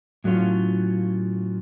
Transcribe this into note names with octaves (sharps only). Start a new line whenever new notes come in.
A2 F#3 A3 C#4 F4